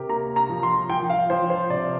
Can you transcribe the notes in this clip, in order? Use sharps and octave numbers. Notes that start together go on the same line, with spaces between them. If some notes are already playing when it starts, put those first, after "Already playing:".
Already playing: C3 G4 A#4
A#3 A#5
A#5
F3
C6
F3 G5
F5
F3 C5
C5
C3 D5